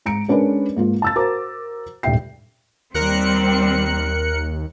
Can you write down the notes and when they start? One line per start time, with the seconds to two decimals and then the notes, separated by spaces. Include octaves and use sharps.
0.06 G#2 A#5 C#7 D7
0.28 G#3 C#4 D4 A#4 B4 D5
0.76 G#2 A#3 F4
1.02 A5 E6 A6
1.16 F#4 A#4 C5 A#5 D6
2.03 D#1 G2 E5 G5 C7
2.94 D#2 G3 C4 A#4 F#6 C#7